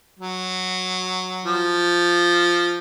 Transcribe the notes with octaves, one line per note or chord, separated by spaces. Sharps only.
F#3
F3